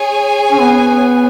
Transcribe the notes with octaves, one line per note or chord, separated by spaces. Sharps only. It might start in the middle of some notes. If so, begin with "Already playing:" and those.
Already playing: G#4 C#5 G#5
C#4
B3